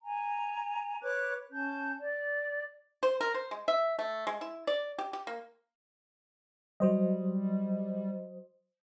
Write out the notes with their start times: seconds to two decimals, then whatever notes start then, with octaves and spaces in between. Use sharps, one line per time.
0.03 G#5 A#5
1.02 B4 C#5 D6 F#6
1.52 C#4 A5 G6
1.99 D5
3.03 C5
3.21 A#4
3.34 C5
3.51 G#3
3.68 E5
3.99 A3
4.27 G#3
4.41 E4
4.67 D5
4.99 G4
5.13 G4
5.27 A#3
6.80 F#3 G3 C5 D#5